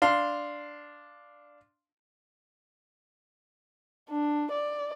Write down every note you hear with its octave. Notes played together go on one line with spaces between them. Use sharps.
D4 F5 C6
D4
D5